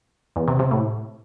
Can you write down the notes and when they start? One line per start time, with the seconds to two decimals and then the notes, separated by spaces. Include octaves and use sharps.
0.36 E2
0.48 C3
0.59 C3
0.71 A2